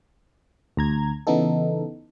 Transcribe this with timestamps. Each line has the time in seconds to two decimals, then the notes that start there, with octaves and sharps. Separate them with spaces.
0.77 D2 A#5 G#6
1.27 C#3 E3 B3 D#4 A4